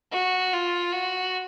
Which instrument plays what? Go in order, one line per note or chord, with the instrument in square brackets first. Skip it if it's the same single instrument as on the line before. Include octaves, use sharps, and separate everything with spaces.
[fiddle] F#4
F4
F#4